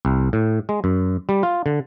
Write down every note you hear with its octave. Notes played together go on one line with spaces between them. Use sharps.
C2
A2
G#3
F#2
G3
F4
D3